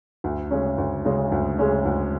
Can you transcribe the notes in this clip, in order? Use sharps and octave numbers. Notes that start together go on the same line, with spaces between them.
D2
C#3 G#3 C#4
D2
C#3 G#3 C#4
D2
C#3 G#3 C#4
D2